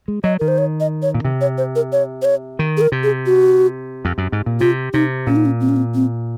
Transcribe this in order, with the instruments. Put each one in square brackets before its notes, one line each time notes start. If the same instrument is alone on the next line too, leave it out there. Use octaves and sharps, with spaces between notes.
[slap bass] G#3
[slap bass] F#3 [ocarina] D#5
[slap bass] D#3 [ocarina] A#4
[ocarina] C5
C#5
D#5
C#5
[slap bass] A#2
C3
[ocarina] C#5
C5
A#4
C#5
C5
C#5
[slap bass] D#3
[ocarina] G#4
A#4
[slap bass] C3
[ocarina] G#4
F#4
[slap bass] F2
F#2
G#2
A#2
[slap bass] C3 [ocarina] F4
[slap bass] C3 [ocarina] D#4
[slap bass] A#2 [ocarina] C#4
[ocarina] D#4
C#4
C4
C#4
C4
C4